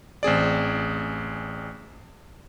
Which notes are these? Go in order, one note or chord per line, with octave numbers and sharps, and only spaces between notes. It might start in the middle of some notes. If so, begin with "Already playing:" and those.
A1 C4 G#4 D5